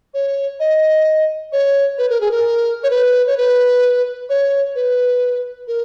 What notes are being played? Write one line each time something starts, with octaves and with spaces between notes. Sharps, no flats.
C#5
D#5
C#5
B4
A#4
G#4
A#4
C#5
B4
C#5
B4
C#5
B4
A#4